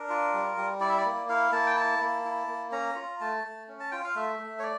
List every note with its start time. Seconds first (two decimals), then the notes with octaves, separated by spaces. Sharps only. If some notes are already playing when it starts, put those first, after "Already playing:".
Already playing: D4 A#4
0.09 F4
0.34 G3
0.57 G3
0.80 E4 D5
0.89 E5
0.98 D5
1.05 A#3
1.29 E4 F5
1.52 A#3 A5
1.67 G5
1.76 E4 A5
2.01 A#3
2.25 E4
2.48 A#3
2.72 C#4 A#5
2.96 F4
3.21 A3 A5
3.44 A3
3.68 C#4
3.80 A5
3.91 F4 G5
4.04 F5
4.15 A3 E5
4.39 A3
4.59 C#5
4.63 D5